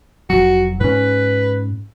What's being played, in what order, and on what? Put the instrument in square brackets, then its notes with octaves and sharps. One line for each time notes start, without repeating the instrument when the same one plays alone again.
[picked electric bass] F1 F#3 [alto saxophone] F#4
[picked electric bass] G#2 C#4 [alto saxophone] B4